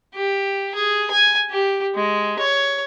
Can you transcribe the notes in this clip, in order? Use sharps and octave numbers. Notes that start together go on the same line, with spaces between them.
G4
G#4
G#5
G4
G#3
C#5